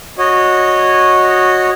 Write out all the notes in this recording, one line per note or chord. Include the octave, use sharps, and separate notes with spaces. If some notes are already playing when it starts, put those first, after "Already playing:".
F#4 C#5 D#5